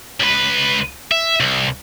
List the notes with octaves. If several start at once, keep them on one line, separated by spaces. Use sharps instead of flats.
C#2 B4
E5
C2